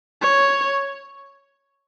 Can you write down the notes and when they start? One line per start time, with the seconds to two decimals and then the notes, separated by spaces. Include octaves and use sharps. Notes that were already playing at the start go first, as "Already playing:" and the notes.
0.22 C#5